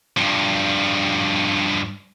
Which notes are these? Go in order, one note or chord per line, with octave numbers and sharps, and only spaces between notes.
G2 F3